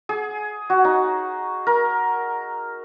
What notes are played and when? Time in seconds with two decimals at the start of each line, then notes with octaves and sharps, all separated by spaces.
0.09 G#4
0.70 F#4
0.85 D#4
1.67 A#4